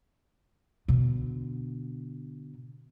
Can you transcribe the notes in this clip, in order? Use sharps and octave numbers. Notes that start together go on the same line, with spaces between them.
B2 D3